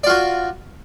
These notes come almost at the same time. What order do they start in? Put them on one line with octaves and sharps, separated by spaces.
D5 F4 F#4